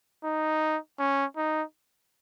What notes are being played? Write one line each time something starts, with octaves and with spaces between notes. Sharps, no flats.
D#4
C#4
D#4